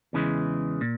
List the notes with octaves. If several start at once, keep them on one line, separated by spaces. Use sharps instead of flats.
E2 C#3 E3 G#3
A#2